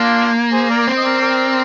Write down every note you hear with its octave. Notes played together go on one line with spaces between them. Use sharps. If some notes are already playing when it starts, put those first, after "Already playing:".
Already playing: A#3 D4 F4
G#4 C5
A#4 D5
C4
D#5
A#4 D5
A#4 D5